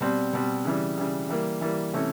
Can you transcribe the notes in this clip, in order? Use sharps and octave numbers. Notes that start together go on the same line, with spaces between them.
B2 G3 C4
B2 G3 C4
C#3 E3 G3
C#3 E3 G3
E3 G3 A#3
E3 G3 A#3
C3 E3 A3 C#4